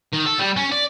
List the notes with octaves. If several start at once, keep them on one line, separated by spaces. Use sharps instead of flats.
D#3
A4
G3
C#4
D5